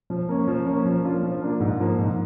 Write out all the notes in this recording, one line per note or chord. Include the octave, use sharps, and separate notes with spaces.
F3
A#3 C#4
F3
A#3 C#4
F3
A#3 D4 F4
F3
A#3 D4 F4
G#2
F3 A#3
G#2